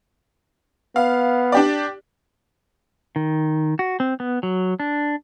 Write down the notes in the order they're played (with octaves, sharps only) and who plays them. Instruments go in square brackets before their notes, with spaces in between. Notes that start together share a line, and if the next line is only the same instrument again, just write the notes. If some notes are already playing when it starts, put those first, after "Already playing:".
[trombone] B3 [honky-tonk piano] F5
[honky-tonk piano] D4 G4 D5
[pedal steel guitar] D#3
F#4
C4
B3
F#3
D4